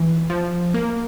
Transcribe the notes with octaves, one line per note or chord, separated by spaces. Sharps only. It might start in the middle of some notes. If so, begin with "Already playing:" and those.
Already playing: E3
F3
A#3